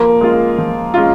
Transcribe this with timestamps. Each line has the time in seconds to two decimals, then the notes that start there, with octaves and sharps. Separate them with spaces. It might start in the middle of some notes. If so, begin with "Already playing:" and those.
Already playing: F3 A#3
0.21 G#3 C#4 F4
0.58 F3
0.94 G#3 C#4 F4